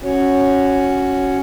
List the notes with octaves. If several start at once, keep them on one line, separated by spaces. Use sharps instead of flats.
C#4 F#4 C#5